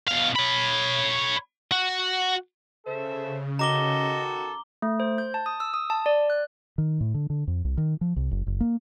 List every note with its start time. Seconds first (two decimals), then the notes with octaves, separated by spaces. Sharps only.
0.08 B2 F5
0.36 C#5 B5
1.72 F#4
2.86 C#3 A4 C5 E5
3.59 D#3 F#4 A4 D#5 A#5 D6 G7
4.82 A3
5.00 C5
5.18 G6
5.34 A5
5.46 D#6
5.60 E6
5.74 D#6
5.90 A5
6.06 D5
6.30 F#6
6.78 D#3
7.01 A2
7.14 D3
7.30 D3
7.47 F2
7.65 C2
7.77 D#3
8.01 F3
8.16 C2
8.31 F#1
8.47 F#1
8.60 A#3